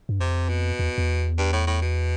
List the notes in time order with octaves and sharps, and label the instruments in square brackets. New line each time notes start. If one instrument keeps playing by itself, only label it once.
[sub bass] G2
[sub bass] F2 [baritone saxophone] C3
[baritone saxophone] B2
[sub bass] E2
E2
[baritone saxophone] G2
A2
A2
B2